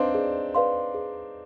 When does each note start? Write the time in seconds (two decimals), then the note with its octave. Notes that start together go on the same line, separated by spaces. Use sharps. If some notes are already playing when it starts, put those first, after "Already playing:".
Already playing: C4 D4 D#4 B4 D5 F5 C6
0.14 G#4
0.55 B4 D5 F5 C6
0.94 G#4